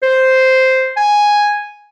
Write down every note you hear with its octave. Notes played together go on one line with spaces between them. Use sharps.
C5
G#5